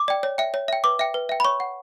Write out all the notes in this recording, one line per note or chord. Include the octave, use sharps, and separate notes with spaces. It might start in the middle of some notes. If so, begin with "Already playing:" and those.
Already playing: D6
D5 G5
C#5
E5 G5
C#5
E5 G5
B4 D6
E5 G5
B4
E5 G5
B5
C#5 C#6
F#5